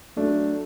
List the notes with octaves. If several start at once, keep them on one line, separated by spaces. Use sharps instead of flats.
F#3 A3 D4